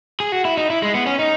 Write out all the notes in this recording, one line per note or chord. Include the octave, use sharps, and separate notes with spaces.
G#4
F#4
E4
D#4
E4
G#3
B3
C#4
D#4